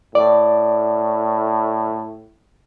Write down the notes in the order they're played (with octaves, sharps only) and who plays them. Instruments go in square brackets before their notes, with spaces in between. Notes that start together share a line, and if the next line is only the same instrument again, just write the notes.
[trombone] A2 [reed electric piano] D5